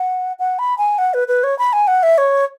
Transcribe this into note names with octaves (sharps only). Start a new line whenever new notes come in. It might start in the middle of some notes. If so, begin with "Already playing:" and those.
Already playing: F#5
F#5
B5
G#5
F#5
B4
B4
C#5
B5
G#5
F#5
E5
C#5